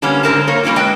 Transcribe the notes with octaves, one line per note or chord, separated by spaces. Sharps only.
D3 G3 A#3 B3 C#4 D4
G#2 D3 D#3 A#4 C5 A5
A#3 A#4 C#5
G3 A#3 C#4 D4 F4
G#3 B4 D#5 G5